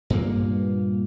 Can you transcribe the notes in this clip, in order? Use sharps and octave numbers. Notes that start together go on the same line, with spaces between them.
G2 A#2 A#3